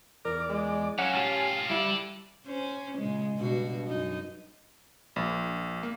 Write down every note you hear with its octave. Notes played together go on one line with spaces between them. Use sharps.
E2 A#4 D5 D6
G#3
F#3 C#4 F5 F#5
A2 F4 G4 G#5 A5
G3 E4 A4 D5
C#4 C5
A#2 C#3 G#3
G2 B2 F#4
F#2 D#4
A#1
A#3